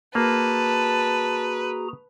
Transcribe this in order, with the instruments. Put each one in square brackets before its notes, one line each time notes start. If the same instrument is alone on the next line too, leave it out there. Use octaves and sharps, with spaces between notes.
[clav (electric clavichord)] A#3 [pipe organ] F#4 G#4 A#5 [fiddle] B4 [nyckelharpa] A5